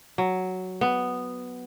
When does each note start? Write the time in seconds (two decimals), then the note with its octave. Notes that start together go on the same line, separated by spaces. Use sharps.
0.18 F#3
0.81 B3